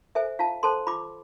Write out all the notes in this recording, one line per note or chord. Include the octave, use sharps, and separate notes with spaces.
A4 C5 E5 G#5
F4 F5 A5
A4 C5 A5 C6
F4 B5 D6